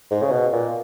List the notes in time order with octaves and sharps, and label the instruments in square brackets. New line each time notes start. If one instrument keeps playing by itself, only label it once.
[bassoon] G#2
C#3
B2
A#2